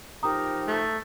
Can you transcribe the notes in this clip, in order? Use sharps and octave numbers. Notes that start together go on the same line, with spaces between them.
F3 D#4 G4 A#4 A#5 D#6
A3